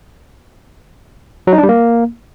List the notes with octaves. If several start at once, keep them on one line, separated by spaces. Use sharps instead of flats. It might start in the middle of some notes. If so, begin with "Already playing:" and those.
F#3
D#4
D4
G3
A#3